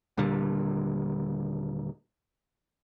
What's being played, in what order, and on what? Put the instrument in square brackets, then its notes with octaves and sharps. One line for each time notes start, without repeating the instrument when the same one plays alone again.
[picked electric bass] D#1 A#2 D3 G3